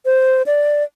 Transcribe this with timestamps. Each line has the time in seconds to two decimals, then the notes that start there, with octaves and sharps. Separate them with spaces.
0.05 C5
0.46 D5